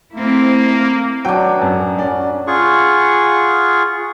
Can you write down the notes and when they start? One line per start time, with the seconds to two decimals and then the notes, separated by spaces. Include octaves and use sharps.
0.13 A3 A#3 C4 E4
1.25 F#3 D4 G5
1.62 F#2
1.98 C#4 D5
2.47 F4 G#4 F#5 C#6